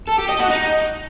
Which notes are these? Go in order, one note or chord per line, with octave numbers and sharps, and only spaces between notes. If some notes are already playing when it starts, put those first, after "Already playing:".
A4
G4
D#5
F#4
D#4